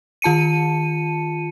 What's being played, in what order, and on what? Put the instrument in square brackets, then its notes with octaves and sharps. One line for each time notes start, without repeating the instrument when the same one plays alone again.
[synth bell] D#3 F4 A5 C#7 D#7